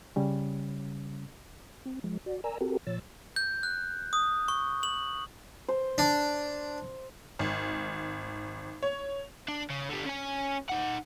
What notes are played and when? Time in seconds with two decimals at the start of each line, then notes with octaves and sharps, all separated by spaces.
0.16 C#3 G3 C#4
1.86 C4
2.04 F3 G#3
2.26 F#4 D5
2.44 A#4 D5 G#5 A#5 E6
2.61 C4 F#4 G4 A4 A#4
2.87 A#2 F3 C#5 E6 A6
3.36 G6
3.63 F#6
4.13 D#6
4.48 C#6
4.83 F#7
5.69 C5
5.98 D4
7.39 G#1
8.82 C#5
9.48 D4
9.70 C#3
9.89 D3 G3
10.06 C#4 G#5
10.69 D#4 F#5